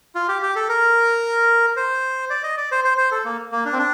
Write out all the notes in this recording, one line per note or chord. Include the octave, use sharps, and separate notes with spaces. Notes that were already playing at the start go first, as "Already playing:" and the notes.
F4
G4
G4
A4
A#4
C5
D5
D#5
D5
C5
C5
C5
A4
A#3
A#3
D4
C4
D4